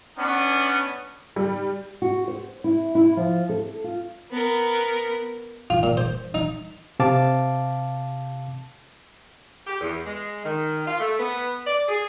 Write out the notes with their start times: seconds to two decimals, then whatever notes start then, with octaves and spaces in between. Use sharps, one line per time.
0.18 B3 C#4 D4
1.36 G3
2.02 F#4
2.28 C5
2.64 E4
2.95 E4
3.17 F3
3.49 A4
3.84 F4
4.31 B3 A#4
5.70 F4
5.83 A#2
5.97 C5
6.34 D#4
7.00 C3 F5 A5 D6
9.67 G4
9.81 E2
10.06 G#3
10.45 D#3
10.87 F4
11.00 A3
11.19 B3
11.66 D5
11.88 G#4